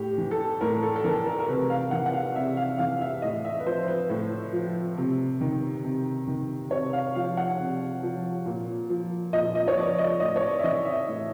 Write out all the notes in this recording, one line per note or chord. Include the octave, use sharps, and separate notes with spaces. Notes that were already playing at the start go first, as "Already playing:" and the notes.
Already playing: A2 G4
E3
A4
A2 A#4
A4
A4
E3 A#4
A#4
A#4
C3 B4
F5
E3 F#5
F#5
F5
C3 E5
F5
E3 F5
E5
A2 D#5
E5
B4
F3 C5
B4
A2
F3
C3
D#3
C3
D#3
C3 C#5
F5
F3 F5
F#5
C3
F3
A#2
F3
A#2 D#5
D#5
C#5
F3 D5
D#5
A2 D#5
C#5
D5
E5
E3 D#5
E5
A2